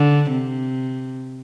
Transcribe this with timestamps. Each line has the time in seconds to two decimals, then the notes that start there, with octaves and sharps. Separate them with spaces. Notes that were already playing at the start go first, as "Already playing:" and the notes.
Already playing: D3
0.31 C3